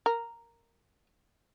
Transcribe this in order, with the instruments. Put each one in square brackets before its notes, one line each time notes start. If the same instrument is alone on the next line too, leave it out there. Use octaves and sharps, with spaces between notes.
[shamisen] A#4